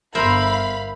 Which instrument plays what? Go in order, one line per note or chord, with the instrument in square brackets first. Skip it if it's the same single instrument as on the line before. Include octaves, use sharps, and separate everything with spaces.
[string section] G1 F5 B5 [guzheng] A#4 C5 E5